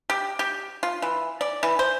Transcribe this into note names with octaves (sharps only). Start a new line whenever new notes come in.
G4
G4
F4
E3
D5
E3
C5